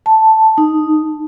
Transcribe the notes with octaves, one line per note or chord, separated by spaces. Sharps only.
A5
D#4